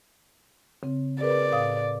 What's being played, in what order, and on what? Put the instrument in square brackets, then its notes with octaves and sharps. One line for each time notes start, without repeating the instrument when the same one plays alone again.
[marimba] C#3 C4
[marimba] G#4 A#4 B4 [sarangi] D5
[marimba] A2 F5 D#6